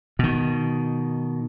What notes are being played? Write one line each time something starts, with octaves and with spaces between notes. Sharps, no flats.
B2 D#3